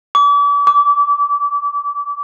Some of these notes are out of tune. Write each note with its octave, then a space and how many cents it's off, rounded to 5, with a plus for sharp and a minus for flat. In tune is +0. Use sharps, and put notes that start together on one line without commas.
D6 -40
D6 -25